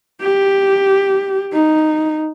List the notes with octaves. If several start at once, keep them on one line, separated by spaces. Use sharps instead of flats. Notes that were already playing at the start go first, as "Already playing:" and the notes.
G4
D#4